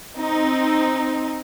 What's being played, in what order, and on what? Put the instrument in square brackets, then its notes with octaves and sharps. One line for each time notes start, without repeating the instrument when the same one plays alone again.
[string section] C4 D#4